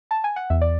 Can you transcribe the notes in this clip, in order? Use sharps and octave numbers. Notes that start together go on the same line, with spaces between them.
A5
G#5
F#5
E2 E5
D5